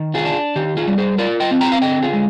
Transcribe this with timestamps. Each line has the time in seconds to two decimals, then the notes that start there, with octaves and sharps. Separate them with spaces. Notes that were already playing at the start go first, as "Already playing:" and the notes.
Already playing: D#3
0.14 F4 G#4
0.25 D4
0.56 D#3 G4
0.77 F4 G#4
0.88 G3
0.98 G#4 C5
1.18 F4 A#4 D5
1.40 D#5 G5
1.51 C4
1.61 G5 A#5
1.72 F5
1.82 D3 D#5 G5
2.02 F4 G#4
2.13 G#3